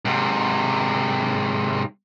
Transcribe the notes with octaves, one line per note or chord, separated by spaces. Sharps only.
G#2 C3